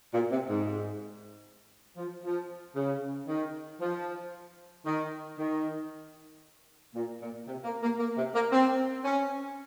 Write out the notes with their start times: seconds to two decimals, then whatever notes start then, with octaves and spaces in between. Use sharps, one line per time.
0.14 A#2
0.31 C3
0.49 G#2
1.97 F3
2.24 F3
2.76 C#3
3.28 D#3
3.81 F3
4.85 D#3
5.37 D#3
6.95 A#2
7.21 A#2
7.47 C3
7.64 A#3
7.82 A#3
7.99 A#3
8.17 C3
8.34 A#3
8.52 C4
9.05 C#4